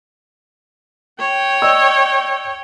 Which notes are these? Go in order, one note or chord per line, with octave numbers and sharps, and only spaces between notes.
C#5 G5
D5 D#5 E6